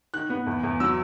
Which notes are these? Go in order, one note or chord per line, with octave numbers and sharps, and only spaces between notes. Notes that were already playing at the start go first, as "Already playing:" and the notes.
D#3 F#6
B3
E2
E2
F#3 E6